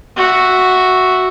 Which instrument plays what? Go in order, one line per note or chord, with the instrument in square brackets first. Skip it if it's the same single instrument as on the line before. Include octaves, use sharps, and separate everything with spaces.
[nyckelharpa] F#4 E5